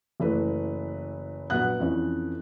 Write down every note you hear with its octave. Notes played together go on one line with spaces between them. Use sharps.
F#1 E3 A3 B4
A#1 F#3 B3 B4 F#5 F#6
F2 E3 C#4